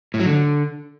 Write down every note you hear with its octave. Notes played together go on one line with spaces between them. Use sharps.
A2
F#3
D3